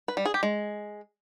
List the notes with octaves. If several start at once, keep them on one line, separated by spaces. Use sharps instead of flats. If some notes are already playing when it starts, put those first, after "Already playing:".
B4
G3
G#4
G4
G#3